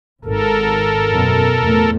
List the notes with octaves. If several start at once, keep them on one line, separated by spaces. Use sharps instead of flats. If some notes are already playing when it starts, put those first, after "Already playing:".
G#1 G#2 A4 A#4
F#2 B2 B3
E2 A2 A3